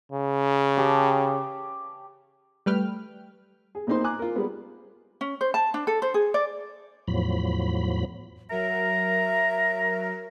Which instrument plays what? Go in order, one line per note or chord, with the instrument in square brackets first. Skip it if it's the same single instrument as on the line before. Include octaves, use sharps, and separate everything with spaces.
[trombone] C#3
[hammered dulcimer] G4 A5
[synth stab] G3 A3 B4 G5 F6
[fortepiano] G#4
B1 A#2 A#3 D#4 C5 C6
G#5 A#5 D6 F#6
F4 A#4
G3 G#3 B3
[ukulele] C#4
C5
A5
D4
A4
C5
G#4
D5
[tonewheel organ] E2 A2 F3 F#3 B5
[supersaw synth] F#3 A#4 [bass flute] E5 [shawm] A#5